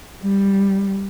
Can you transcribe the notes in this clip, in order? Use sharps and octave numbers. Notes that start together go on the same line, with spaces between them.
G3